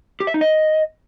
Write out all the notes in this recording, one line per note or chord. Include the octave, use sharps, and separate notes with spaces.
G4
E5
D#4
D#5